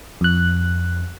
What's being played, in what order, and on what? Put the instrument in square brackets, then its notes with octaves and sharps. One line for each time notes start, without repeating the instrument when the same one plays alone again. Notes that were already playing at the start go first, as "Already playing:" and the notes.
[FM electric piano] F2 F#6